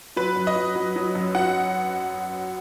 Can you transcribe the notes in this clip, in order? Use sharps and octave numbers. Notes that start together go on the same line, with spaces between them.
F#3 B4
F#2
D#5
F#3
F#3
F#3
F#2
F#3 F#5